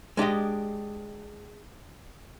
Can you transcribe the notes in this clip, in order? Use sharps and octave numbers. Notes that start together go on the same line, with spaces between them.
G#3 D4 G4 D#5